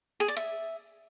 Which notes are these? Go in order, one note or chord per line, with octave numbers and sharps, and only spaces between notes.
G#4
D5
E5